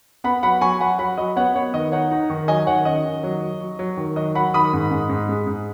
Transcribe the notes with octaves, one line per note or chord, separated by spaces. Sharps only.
B3 F#5 B5
F#3 F#5 B5
F#3 G#5 C#6
F#3 F#5 B5
F#3 F#5 B5
F#3 D#5
B3 C#5 F#5
B3 C#5
D#3 D#5
D#4 C#5 F#5
D#4
D#3
F#3 D#5 G#5
D#3 C#5 F#5
C#4 D#5
D#3
F#3
F#3
F#3
F#3
D#3
F#3 D#5
F#3 F#5 B5
D#3 B5 D#6
G#2
G#2
G#2
G#3
G#2